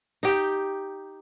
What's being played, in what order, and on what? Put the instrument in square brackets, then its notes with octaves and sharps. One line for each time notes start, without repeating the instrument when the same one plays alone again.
[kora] D#4 G4